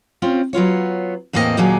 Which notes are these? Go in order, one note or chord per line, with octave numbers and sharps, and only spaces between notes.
C4 C#4 F4
F#3 B3 F4 C#5
E2 A2 A#3 C4 A4 D#5
D#2 A#2 F#3 A#3 G#4